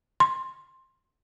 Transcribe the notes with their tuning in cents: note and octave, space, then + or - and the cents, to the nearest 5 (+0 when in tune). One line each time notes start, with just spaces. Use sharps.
C6 +15